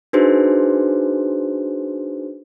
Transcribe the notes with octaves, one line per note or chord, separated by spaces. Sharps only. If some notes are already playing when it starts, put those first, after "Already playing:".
D4 D#4 F#4 G#4 B4 C5